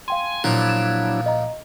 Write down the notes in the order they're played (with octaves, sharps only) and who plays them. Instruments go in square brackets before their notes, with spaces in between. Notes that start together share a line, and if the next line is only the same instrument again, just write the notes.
[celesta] F5 G5 C6 [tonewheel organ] G#5
[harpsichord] A#2 F3 [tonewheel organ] F#3 D4 E4
[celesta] E7
D#5 A#5